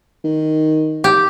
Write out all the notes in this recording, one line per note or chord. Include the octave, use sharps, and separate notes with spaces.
D#3
G4